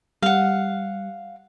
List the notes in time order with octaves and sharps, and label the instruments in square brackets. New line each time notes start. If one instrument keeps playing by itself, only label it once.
[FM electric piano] G3 [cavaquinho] F5 F#5